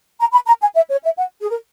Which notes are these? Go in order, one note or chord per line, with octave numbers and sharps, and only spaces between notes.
A#5
B5
A#5
G#5
E5
C#5
E5
F#5
G#4
A#4